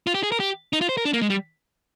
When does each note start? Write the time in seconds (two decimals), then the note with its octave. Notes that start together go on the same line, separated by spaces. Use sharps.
0.07 F4
0.14 G4
0.23 G#4
0.32 A#4
0.40 G4
0.73 D#4
0.81 F4
0.89 C5
0.97 A#4
1.05 D4
1.14 A#3
1.22 G#3
1.30 G3